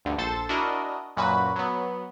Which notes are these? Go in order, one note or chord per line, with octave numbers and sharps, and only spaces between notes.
D2 G2 D3
A#1 A4 C5 A6
D4 E4 F#4 A#4 D#5
F#2 A#2 F#4 B4 B5
F#3 B3